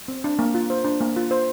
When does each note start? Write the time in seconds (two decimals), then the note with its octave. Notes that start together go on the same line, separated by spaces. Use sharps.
0.08 C4
0.24 D4
0.39 A#3
0.54 F4
0.70 C5
0.85 D4
1.01 A#3
1.16 F4
1.31 C5